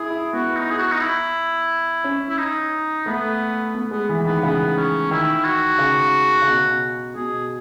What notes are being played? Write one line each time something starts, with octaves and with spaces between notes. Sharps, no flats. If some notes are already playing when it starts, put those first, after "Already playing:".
Already playing: E4 G#4
E4
B3 F#4
D#4
G#4
F#4
D#4
E4
C#4
E4
D#4
A3 B3
B3
G#3 B3
E3
D#3 B3
C#3 B3
C#4
D#3 E4
F#4
C#3
C#3
B2
B2 G#4